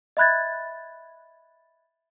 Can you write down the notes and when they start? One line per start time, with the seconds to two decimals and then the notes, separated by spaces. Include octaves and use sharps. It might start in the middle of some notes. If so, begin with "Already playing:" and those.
0.17 D#5 E5 B5 F#6 G#6 A6